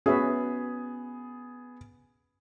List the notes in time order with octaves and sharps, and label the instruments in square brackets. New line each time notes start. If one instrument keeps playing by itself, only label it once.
[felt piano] B3 G#4 [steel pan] C#4 F#4 E5